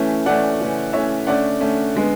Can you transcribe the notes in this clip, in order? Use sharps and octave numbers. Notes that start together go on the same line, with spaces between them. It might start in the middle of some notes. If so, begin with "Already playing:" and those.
Already playing: E3 A3 C#4
E3 A3 C#4 D5 F#5
C#3 E3 A3 C#4
C#3 E3 A3 C#4 C#5 E5
D3 A3 C#4 D5 F#5
D3 A3 C#4
D3 G#3 B3